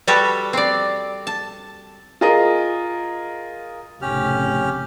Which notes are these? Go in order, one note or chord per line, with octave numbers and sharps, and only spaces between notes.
G3 F#4 G4 A4 B4
C4 D5
A5
F4 G#4 A#4 D#5 D#6
F1 A2 C#3 C#4 G4 F6